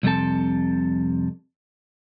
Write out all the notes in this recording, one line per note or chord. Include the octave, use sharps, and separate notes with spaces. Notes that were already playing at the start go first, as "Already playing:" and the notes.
C2 F2 C3 C4 A4 A5